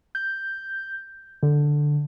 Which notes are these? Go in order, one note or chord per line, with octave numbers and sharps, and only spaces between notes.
G6
D3